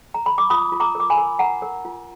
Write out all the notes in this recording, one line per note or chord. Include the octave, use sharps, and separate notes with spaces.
A#5
B5
D6
F4 B5 D#6
F4
A#5 D6
A#4 D6
G#5 B5
A#4
A#4 F#5 A#5
A#4
F4